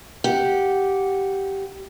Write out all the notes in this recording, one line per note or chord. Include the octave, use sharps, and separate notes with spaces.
G4 F#5